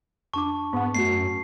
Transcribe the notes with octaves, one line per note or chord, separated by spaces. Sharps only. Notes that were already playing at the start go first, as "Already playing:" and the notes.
F2 D4 A5 C#6 D6
G#2 B3 F#5
F#2 A3 F#4 C7